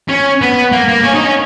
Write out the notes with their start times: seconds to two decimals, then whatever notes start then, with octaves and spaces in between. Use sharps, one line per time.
0.09 C#4
0.41 B3
0.72 A#3
0.88 A#3
1.04 C#4
1.15 D#4
1.24 C#4